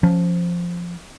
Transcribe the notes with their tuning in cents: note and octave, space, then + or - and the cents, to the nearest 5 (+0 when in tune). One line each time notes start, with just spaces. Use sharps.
F3 +0 C#4 +0